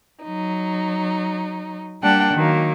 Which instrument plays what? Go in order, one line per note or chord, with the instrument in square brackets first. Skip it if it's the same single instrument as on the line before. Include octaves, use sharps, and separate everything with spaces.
[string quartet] F#3 D#4
G3 A#3 D4 F#5 G5 A5
D#3 F#3 A#3